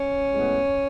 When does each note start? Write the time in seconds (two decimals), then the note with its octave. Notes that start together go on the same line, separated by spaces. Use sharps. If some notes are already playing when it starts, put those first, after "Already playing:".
Already playing: C#4
0.30 A2 G#3 B3